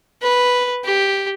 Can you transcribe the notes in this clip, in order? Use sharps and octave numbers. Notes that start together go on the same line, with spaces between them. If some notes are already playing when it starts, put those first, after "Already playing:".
B4
G4